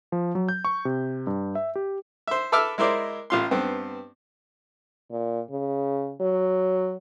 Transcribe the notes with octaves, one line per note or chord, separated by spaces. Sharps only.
F3
F#3
G6
C#6
C3
G2
E5
G4
C5 E5
A4 B4 E5 D6 E6 F6
G#3 E4 A#4 C5 D5
A1 F4 C6
G2 B3 C4
A#2
C#3
F#3